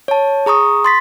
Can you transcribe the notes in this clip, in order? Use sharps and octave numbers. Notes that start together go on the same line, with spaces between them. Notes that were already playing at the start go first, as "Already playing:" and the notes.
C#5 A5
G#4 A#5 C#6 D#6
C6 A6 B6